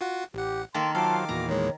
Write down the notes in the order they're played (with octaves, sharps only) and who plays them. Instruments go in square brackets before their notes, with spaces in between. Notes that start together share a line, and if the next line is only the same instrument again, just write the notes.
[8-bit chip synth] F4 F#4 F#5
[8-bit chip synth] A1 F#5 [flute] G4
[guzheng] D#3 A#3 A4 [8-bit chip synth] A5 [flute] C6
[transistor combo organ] F#3 F4 C5 [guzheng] A4 [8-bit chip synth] F5 D6 [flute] A5
[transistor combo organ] E2 A#2 [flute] F#4 [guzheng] A#5
[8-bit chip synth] D#3 G#3 [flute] C#5